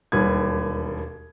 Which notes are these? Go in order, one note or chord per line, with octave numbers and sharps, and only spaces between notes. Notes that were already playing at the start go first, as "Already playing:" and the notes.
E1 D#2 G3 B4 D#6 G#6